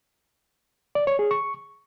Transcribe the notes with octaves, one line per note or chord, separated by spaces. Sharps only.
D5
C#5
G#4
C#6